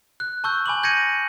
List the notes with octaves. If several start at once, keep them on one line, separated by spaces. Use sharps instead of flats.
F#6
A5 C#6 E6 G6
G#5 B5 D6 F#7
G6 G#6 A#6 C#7 D#7